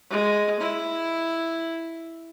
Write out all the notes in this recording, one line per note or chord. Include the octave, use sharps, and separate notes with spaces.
G#3
E4